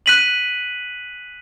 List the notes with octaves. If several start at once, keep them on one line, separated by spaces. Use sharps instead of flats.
F#6 B6 D#7 F#7